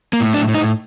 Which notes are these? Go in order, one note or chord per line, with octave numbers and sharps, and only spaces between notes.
A#3
A2
D4
A2
D#4